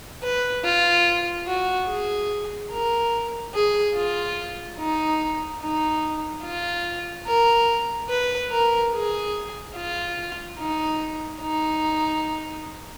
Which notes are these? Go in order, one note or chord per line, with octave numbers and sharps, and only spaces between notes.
B4
F4
F#4
G#4
A#4
G#4
F4
D#4
D#4
F4
A#4
B4
A#4
G#4
F4
D#4
D#4